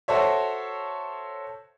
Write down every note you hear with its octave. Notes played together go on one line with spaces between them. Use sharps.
F#4 A4 C5 C#5 E5